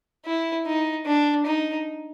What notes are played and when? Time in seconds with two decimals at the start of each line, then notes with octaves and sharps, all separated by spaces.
0.26 E4
0.66 D#4
1.06 D4
1.46 D#4